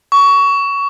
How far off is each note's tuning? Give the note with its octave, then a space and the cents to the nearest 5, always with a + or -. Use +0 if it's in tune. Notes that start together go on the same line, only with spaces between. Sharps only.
C#6 +20